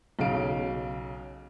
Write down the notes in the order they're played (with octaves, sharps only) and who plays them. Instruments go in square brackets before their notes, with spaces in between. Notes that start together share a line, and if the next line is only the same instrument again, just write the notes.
[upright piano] B1 C#3 F5 D7